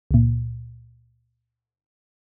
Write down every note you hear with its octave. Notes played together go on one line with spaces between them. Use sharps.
C#2 A#2